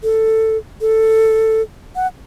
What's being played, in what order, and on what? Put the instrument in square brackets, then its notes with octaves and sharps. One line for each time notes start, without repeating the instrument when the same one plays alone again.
[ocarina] A4
A4
F#5